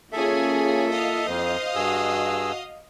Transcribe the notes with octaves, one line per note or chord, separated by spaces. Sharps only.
A#3 C#4 F4 G#4 A4 E5
D#5 F5
F2 C5
G2 F#4 G#4 E6